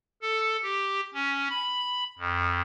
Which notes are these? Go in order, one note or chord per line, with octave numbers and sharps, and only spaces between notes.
A4
G4
C#4
B5
F2